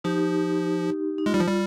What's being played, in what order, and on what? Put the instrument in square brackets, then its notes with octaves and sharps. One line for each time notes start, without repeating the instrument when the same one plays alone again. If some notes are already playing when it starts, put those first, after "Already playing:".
[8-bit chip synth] F3 [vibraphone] D#4 G4
[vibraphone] D#4
[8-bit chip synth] G#3 [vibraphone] F4
[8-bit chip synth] G3
F3
G3